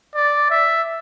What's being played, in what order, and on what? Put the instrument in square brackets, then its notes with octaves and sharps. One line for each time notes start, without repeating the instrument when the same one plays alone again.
[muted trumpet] D5
E5